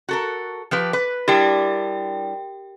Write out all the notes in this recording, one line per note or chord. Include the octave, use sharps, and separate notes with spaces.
F#4 A4 A#4
F3 G4 B4
B4
G3 D4 E4 G4 A#4 G5